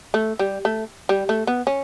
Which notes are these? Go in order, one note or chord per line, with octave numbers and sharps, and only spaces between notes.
A3
G3
A3
G3
A3
B3
C#4